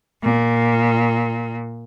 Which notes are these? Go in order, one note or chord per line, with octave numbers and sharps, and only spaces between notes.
A#2